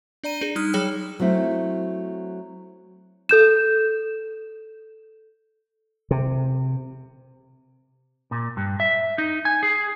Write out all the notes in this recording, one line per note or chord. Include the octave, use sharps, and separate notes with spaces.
D4 D5 A#5 D#7
D4 G#4
G3 D#4 D#6 F6 F#6
F#3 G#4 C#5 G5 F6
F#3 A3 C4 E4
A4 G6 E7
C3
A#2
G2
E5
D#4
G#5
G#4